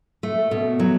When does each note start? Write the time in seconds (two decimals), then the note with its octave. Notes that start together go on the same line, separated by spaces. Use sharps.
0.23 A3
0.51 B2
0.80 F#3